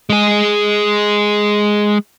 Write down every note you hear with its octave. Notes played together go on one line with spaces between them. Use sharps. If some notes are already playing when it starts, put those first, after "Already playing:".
G#3 G#4